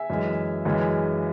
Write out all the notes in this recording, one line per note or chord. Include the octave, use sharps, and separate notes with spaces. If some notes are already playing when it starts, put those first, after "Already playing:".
Already playing: E5 G#5
F#2 E3 G#3
F#2 C#3 E3 G#3